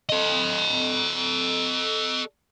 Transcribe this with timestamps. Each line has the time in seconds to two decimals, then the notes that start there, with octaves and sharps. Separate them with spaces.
0.09 A4 D#5